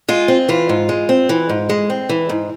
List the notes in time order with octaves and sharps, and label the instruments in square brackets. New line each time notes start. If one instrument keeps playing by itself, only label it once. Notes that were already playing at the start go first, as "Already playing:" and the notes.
[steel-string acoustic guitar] G#3 F4
C4
E3 F4
G#2
G#3
C4
E3
G#2
G#3
C4
E3
G#2